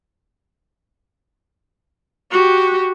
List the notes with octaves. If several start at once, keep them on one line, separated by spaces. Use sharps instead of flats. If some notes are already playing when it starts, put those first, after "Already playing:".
F#4 G4